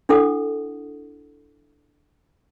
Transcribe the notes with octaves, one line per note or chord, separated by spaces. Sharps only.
D4 E4 A4 F#5 D#6